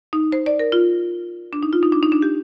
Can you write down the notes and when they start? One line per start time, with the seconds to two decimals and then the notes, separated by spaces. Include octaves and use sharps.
0.13 D#4
0.32 C5
0.46 D5
0.59 A#4
0.72 F4
1.53 D4
1.63 D#4
1.73 F4
1.83 D#4
1.92 D4
2.03 D#4
2.12 D4
2.22 G4